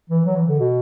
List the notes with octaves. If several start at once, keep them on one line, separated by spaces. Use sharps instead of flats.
E3
F#3
E3
D3
B2